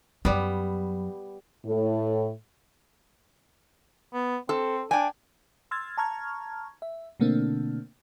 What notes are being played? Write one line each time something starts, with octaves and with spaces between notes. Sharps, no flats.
F#2 F#3 G3 B3
A2
B3
C4 A4
D4 G5 G#5
C6 E6 F6 G#6 A6
A5 A#5 C#6 F6 G#6
E5
B2 D3 A3 A#3 C4 D4